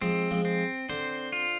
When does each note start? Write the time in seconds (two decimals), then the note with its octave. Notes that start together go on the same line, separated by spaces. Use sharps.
0.02 F3 G#3 C4
0.31 F3 G#3
0.45 C4
0.89 D3 C5
1.32 F4